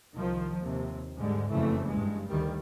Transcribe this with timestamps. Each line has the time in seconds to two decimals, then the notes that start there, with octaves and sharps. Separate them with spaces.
0.15 C2 D#3 F3
0.60 D#2 C3
1.16 G#2 D3 G3 G#3
1.51 F#1 F2 C#3 E3 A3
1.89 G2 G#3
2.28 D2 D#3 G3